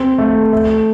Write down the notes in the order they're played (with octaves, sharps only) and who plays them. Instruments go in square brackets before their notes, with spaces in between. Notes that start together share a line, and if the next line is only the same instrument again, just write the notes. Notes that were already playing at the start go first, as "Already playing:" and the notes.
Already playing: [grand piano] C4
A3
A3